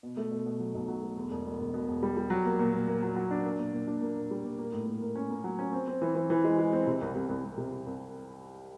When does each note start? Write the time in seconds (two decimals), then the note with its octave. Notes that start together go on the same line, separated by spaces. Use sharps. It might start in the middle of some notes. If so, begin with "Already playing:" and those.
0.03 B2
0.17 A3
0.31 B2
0.46 B2
0.60 F#3
0.75 B1
0.88 F#3
1.03 A3
1.17 E2
1.31 E1
1.45 B2
1.60 E1
1.74 B2
1.88 E1
2.03 G3
2.17 G3
2.30 F#3
2.45 A#3
2.59 A#2
2.73 A#2
2.88 A#3
3.03 F#3
3.16 F#3
3.31 D4
3.44 A#3
3.59 A#2
3.73 A#2
3.87 D4
4.02 A#3
4.17 A#2
4.31 G3
4.44 A#2
4.59 A#3
4.73 A2
4.87 A#3
5.02 A#3
5.16 C#4
5.30 A#3
5.44 F#3
5.59 C#4
5.73 C4
5.87 C4
6.02 E3
6.15 E3
6.30 E3
6.44 G#3
6.59 G#3
6.73 C4
6.87 C3
7.01 C2
7.15 C2
7.29 C2
7.44 C2
7.58 C3
7.72 C2
7.86 C2